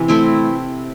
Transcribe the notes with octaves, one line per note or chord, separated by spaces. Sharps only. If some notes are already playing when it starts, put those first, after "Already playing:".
Already playing: C3 E3
A3 C4 E4